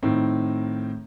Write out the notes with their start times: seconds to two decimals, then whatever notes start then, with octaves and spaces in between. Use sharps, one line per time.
0.03 A2 D#3 C4